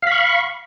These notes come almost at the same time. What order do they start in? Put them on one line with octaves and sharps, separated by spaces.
F5 B5 C#6